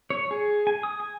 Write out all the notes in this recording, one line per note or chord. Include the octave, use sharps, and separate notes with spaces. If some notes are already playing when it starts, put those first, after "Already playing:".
C#5
G#4
G#5
D#6
G#5